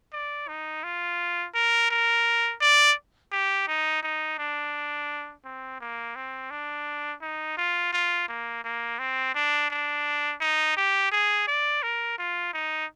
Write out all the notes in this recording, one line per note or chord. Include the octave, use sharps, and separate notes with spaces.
D5
D#4
F4
A#4
A#4
D5
G4
D#4
D#4
D4
C4
A#3
C4
D4
D#4
F4
F4
A#3
A#3
C4
D4
D4
D#4
G4
G#4
D5
A#4
F4
D#4